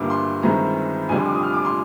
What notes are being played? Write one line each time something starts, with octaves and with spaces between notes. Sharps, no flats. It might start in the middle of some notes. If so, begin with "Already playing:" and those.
Already playing: G1 G2 D3 G3 A#3 D6
C6
G1 G2 D#3 G#3 C4 A#5
F1 F2 D3 G3 D4 G#5
C6
D6
D#6
F6
D6
C6